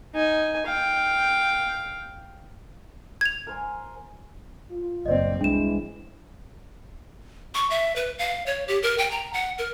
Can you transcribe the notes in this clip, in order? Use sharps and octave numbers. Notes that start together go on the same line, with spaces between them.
D#4 G#5
F5 G5
G#6 F7
A#4 C5 G#5
F4
F#1 C4 D5 D#5
C2 E3 G#3 D4 E7
C#6
E5
B4
F5
C#5
G4
A#4
G5
A#5
F#5
A#4